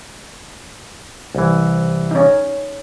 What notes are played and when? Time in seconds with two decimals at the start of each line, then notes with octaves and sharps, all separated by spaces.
1.35 C2 E3
2.11 C#4 D#4